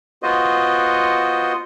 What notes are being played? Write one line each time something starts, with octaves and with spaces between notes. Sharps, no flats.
B3 F4 F#4 C5 D#5